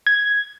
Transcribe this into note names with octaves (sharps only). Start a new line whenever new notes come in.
G#6